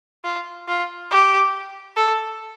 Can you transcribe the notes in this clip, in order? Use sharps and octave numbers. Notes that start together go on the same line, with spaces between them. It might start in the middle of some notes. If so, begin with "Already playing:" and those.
F4
F4
G4
A4